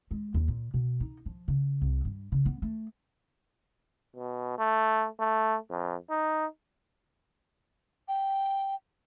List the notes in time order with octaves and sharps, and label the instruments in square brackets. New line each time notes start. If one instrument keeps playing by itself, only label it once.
[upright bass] G#3
D#2
A#2
B2
D#4
F3
C#3
C2
G2
C#3
B3
A3
[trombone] B2
A3
A3
F2
D#4
[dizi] G5